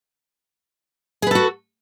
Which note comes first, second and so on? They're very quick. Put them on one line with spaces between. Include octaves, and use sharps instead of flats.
G#4 B4 A4 F#4